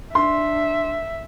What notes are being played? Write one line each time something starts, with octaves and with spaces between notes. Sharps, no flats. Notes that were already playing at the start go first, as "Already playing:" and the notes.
D4 E5 C6